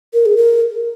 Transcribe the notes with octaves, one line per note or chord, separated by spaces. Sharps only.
A#4
G#4
A#4